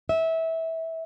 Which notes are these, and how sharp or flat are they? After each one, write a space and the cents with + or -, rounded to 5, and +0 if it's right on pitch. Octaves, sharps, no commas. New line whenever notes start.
E5 -20